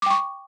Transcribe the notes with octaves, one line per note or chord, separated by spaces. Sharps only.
G5 C#6 D6